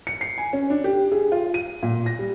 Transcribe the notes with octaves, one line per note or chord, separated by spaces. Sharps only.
C#7
C7
G#5
C#4
D4
G4
G#4
F4
D#7
A#2
A#6
G3